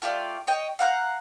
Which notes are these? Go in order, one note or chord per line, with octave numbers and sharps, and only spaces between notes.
A3 F4 G4 D5
C#5 D#5 G5
F5 F#5 A#5 G6